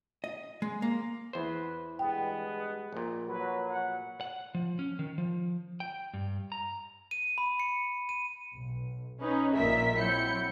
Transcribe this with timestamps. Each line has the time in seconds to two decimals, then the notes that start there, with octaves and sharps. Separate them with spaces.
0.24 D#5
0.62 G#3
0.82 A#3
1.33 E2 B4 C5
1.99 G2 G#3 B3 G5
2.93 A#1 A#2
3.28 F#3 B4
3.67 F#5
4.21 F#5
4.55 F3
4.79 C#4
4.99 D#3
5.18 F3
5.80 G5
6.14 G2
6.52 A#5
7.11 D#7
7.38 B5
7.60 C#7
8.09 D#7
8.55 B1
9.21 C#4 D#4 B4
9.56 A#1 A#2 A#4 D#5 E5 B6
9.97 F#3 C4 E4 G6 C#7